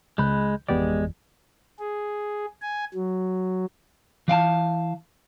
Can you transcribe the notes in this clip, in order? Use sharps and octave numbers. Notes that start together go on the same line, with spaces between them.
C#2 G#3 B5 F#6 G6
G#1 F2 E3 G#3 B3 G4 D5
G#4
G#5
F#3
E3 F5 G5 A5